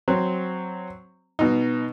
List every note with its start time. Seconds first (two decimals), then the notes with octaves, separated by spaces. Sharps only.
0.08 F#3 C4
1.39 B2 D#4